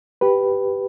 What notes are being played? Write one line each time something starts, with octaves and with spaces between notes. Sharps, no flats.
G4 B4